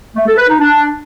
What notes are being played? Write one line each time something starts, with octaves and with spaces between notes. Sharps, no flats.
A3
A4
B4
D#4
D4